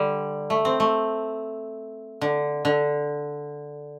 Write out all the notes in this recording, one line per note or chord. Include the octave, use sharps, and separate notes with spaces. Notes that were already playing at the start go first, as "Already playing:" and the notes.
Already playing: D3 G3
A3
C4
A3
D3
D3